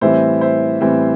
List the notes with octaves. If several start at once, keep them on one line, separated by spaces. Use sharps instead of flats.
A2 E3 G3 C4 C5 E5
C5 E5
A2 E3 G3 C4